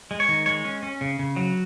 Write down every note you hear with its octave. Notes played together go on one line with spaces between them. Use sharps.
G#3
C#5
D#3
G#3 C#5
C#4
C#4
C#3
C#3
F#3